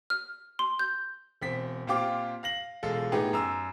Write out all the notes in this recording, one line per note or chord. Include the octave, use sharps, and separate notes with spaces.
F6
C6
G6
E1 C4 B6
A#2 C4 F4 G4 D6
F5 A#6 F#7
E1 G#3 F4 A4
A2 B3 D#4 G4 G#4
F#2 A#5 E6